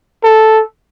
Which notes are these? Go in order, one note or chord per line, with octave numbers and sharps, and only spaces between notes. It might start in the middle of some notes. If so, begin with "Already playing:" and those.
A4